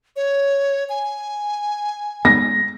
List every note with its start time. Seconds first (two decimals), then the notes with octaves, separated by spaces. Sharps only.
0.16 C#5
0.89 G#5
2.25 G#3 B3 A#6